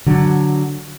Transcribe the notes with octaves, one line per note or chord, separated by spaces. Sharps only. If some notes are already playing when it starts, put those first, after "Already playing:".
D3 F#3